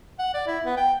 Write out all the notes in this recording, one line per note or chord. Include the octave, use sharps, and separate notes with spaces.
F#5
D5
E4
B3
G5